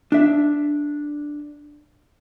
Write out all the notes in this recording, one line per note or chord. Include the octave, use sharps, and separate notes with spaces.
D4 E5